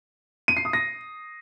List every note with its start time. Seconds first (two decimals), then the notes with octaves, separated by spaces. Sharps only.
0.48 D#7
0.57 C7
0.65 D#6
0.73 A#6